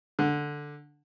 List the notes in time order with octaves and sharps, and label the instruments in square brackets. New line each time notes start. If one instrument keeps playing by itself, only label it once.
[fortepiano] D3